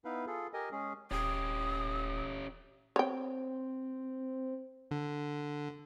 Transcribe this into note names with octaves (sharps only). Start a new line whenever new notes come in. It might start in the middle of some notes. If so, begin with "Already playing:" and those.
B3 D#4 E4 B4 F5
F4 G#4 A4
G4 A#4 D#5 G#5
G#3 C#4 G#4
D#1 C#4 G4 D#6
C4 C#5 G5
D3